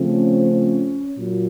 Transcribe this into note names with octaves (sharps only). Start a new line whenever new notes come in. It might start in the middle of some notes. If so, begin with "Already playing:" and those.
Already playing: C#3 F3 A3 C4
C#4
C#4
A#2 F#3